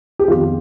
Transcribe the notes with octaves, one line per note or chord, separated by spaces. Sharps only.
G4
F2 D#3 B3 F4